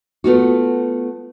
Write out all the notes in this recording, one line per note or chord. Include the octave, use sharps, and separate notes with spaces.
A3 B3 F4 F#4